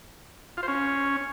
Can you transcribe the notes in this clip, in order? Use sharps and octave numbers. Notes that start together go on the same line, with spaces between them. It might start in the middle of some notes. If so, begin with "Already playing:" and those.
F4
C5
C#4